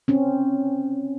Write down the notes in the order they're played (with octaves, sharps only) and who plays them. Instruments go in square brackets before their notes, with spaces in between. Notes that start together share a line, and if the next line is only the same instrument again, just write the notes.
[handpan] C4 C#4